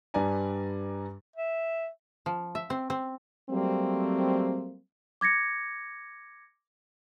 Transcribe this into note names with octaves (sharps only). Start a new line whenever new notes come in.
G2 G3 B4 D5 G#5 A#5
E5
F3
E5
C4
C4
F#3 G3 A3 A#3 C4
D6 G#6 A#6 C#7